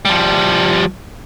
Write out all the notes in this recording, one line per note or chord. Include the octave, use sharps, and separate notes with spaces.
F3 G3